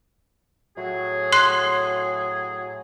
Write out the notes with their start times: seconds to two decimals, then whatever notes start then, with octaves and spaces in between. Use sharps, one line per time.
0.77 A2 F#3 G#4
1.32 C6 F#6 C7